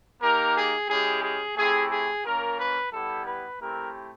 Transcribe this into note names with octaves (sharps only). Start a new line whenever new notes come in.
A#3 D#4 G4 A#4
G#4
G#3 C#4 E4 G4 G#4
G#4
A3 C4 E4 G4 G#4
G#4
A#3 C#4 F4 A#4
B4
G3 B3 E4 G4 A4
B4
A3 C4 E4 G4 A#4